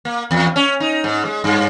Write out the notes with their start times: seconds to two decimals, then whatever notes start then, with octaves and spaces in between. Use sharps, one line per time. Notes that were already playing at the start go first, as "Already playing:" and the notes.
0.05 A#3
0.31 E2
0.56 C#4
0.80 D#4
1.04 G#2
1.25 G#3
1.44 G2